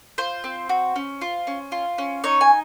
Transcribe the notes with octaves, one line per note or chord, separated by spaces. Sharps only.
F4 C5
C4
F#4
C#4
F4
C#4
F4
C#4
D#4 C#5
G#5